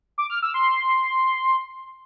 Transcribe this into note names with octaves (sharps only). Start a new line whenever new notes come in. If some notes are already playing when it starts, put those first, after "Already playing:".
D6
F6
E6
C6